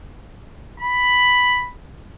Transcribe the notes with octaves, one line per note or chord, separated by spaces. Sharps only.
B5